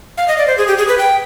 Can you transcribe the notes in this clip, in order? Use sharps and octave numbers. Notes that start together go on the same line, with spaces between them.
F5
D#5
D5
C5
G#4
G4
G#4
B4
G5